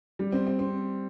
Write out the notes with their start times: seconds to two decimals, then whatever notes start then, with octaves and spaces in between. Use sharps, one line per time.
0.19 G3
0.32 C4
0.47 C4
0.59 C4